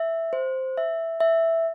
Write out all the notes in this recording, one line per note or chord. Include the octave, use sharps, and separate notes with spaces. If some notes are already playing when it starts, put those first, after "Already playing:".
Already playing: E5
C5
E5
E5